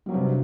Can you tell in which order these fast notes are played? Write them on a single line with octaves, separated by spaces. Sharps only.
G3 F#3 G2 C3